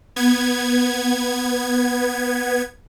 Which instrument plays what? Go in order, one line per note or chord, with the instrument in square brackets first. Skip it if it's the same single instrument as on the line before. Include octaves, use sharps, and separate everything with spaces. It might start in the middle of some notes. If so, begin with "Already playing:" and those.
[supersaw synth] B3 G#6